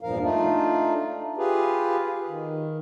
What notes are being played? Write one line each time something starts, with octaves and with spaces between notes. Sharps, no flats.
E2 G2 A#2 F3 A#4 F5
A3 D4 D#4 F4
F4 G4 G#4 B4
D#3